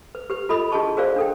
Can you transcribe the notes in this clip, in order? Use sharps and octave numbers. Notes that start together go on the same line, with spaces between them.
B4
G4 B4
F4 A4 D#5 B5 D#6
D4 F#4 G#4 D#5 A5 C#6
F#4 G#4 A#4 C5 D5 F5
D4 A4 G5